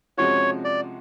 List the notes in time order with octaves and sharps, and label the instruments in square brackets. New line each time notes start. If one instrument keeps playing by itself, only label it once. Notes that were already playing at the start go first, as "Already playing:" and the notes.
[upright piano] C3 F3 G#3 C#4 F#4 [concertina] C#5
[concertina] D5